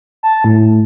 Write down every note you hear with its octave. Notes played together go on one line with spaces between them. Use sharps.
A5
A2